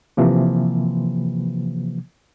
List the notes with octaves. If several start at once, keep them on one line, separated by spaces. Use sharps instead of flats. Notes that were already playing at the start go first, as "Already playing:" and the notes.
C3 E3 F3 A#3